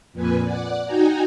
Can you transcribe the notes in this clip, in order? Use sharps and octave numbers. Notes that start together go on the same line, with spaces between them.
F2 A#2 B4 G#5
D5 F#5
D#4 F#4 G5 G#5 A#5